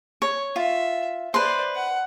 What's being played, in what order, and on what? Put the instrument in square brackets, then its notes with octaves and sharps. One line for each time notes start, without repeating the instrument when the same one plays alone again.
[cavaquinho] C#5
[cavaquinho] F4 [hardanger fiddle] E5
[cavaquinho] B4 C6 [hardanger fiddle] C5 D5
[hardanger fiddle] F#5